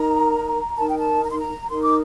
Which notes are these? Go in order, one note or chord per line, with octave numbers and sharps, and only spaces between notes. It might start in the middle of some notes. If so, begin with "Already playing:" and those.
Already playing: D#4 A#4 A#5
D#4 A#4 A5
G5
A5
A#5
C6
A#5
D#4 A#4 C6
D6